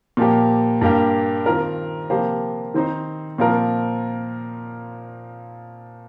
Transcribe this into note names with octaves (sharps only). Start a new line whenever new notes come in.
A#2 F3 A#3 G4
G2 G3 A#3 G4
D#3 C4 F4 A#4
C3 F3 A#3 G4 C5
D#3 C4 D#4 C5
A#2 F3 C4 F4 A#4